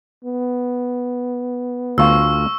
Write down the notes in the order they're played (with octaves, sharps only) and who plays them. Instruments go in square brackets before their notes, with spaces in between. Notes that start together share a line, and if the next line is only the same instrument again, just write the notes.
[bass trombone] B3
[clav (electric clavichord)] D2 F4 F5 [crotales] C#6 E6